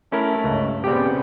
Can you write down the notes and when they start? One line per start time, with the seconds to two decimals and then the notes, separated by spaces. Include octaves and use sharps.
0.12 A3 C#4 E4 A#4
0.44 C#2 G2
0.84 C#3 B3 C4 G4 D5 G5